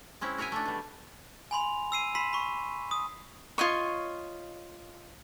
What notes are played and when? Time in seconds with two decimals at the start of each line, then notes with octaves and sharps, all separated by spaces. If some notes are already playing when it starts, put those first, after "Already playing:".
0.21 G#3 C4 C#4 E4
0.38 F#4 A#4 C#5 E5 G#5
0.52 A3 D4
0.66 B2 G3
1.51 G#5 B5 C6 F7
1.92 E6 C7 D#7
2.15 B5 C6 B6 C7 E7
2.33 B5 C#6
2.91 D#6
3.58 F4 C#5 D#5 C#6